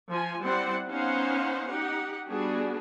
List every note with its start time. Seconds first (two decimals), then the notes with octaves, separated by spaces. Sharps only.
0.10 F3 G#5
0.43 G3 C4 E4 C5 D5 F#5
0.87 B3 C#4 D#4 C5 F5 F#5
1.68 D#4 G4 F#5
2.28 G3 B3 D4 F#4 G#4